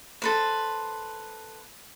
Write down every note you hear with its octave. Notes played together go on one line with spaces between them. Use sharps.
A4 B4 C5